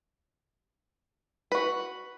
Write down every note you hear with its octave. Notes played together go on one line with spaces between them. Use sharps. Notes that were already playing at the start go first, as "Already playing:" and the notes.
F#4 B4